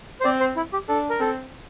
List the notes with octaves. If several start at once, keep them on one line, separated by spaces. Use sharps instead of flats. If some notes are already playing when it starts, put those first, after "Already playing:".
C5
C4 D5
C5
E4
G4
D4 A4
A#4
C4 A4